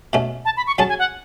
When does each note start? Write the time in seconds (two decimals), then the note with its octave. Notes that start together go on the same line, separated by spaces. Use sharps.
0.13 B2 A3 C#4
0.45 A5
0.57 B5
0.67 C#6
0.78 F#3 C#4 G#4 C#5 A5
0.89 G#5
0.99 F#5